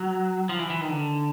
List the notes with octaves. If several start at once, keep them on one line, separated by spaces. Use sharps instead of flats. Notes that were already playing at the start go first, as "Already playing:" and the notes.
Already playing: F#3
F3
E3
E3
D#3
D3